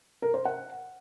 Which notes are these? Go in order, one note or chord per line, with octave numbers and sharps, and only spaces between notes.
A#4
C5
F#5